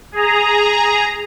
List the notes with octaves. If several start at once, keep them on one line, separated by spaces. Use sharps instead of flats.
G#4 A#5